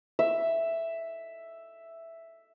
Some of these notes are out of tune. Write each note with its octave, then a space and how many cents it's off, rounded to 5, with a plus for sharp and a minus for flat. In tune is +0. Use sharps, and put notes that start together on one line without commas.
E5 +5